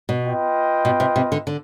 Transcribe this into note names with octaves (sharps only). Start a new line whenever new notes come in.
B2
F4 B4 D#5 G5
B2
C3
C3
D3
D3